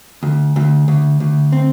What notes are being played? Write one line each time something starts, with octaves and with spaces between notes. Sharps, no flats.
D2
D2
D2
D2
C4